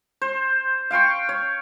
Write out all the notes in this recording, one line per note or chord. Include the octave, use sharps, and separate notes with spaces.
C5
F5 G5 C6 C#6
C#5